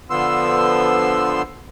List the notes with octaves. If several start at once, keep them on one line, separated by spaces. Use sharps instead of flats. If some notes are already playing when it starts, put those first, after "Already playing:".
D3 F3 B3 C6 E6